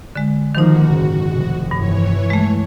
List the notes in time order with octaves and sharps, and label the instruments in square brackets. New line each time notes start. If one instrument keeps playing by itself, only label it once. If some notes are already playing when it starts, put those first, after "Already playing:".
[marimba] D3 G#3
[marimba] D#3 D#4 [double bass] F3 A#3 [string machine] F#4
[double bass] F#1 G#2
F1
[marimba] G2 [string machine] E3 C#5
[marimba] G#3 A3